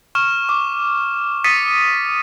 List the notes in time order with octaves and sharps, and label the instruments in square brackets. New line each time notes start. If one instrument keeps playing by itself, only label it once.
[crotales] C#6 F6 E7
D6
D#6 A6 B6 C#7 D#7